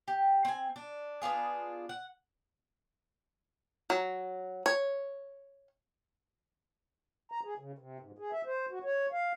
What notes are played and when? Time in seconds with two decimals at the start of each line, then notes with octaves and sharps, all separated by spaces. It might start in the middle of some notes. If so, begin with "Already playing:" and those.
0.08 G4
0.45 C4 G#5
0.76 D4
1.22 B3 D4 F4 G#4
1.89 F#5
3.90 F#3
4.66 C#5
7.32 A#5
7.44 G#4
7.59 C#3
7.79 C3
8.00 G#2
8.19 G#4
8.32 E5
8.46 C5
8.71 F#4
8.84 C#5
9.12 F5